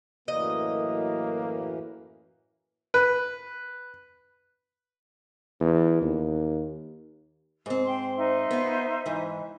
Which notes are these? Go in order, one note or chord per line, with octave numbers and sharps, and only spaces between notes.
F#2 A2 E3 A#3 D#5
B4
E2
D#2
G#2 C4
G5 C6
D#4 C5 E5
B3 F4
G#2 E3